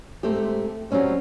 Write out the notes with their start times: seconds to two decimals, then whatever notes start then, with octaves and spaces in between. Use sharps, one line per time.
0.23 G#2 A3 C4 G4
0.91 F#3 G3 C4 C#4 C5